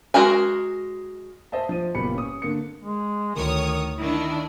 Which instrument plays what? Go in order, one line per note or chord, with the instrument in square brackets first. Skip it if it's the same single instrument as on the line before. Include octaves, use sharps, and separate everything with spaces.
[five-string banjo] G#3 F#4 A#4 G#5
[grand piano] C5 D#5 E5 A5
F3 D#7
F#1 A#2 G3 B3 B5 C#7
C#4 D#6
D3 A#3 C#7
[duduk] G#3
[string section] D2 C#5 D#6 [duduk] D#3
[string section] D#3 D4 [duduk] E4